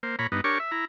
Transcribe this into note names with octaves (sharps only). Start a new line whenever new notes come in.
A#3 C5
A#2 C#5 A#5 B5
G2 B3 D#4
D4 G4 A#4 C#5 C#6
E5
E4 A#5